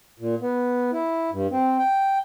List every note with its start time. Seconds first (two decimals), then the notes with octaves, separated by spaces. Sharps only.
0.19 A#2
0.42 B3
0.92 E4
1.31 G2
1.51 C4
1.78 G5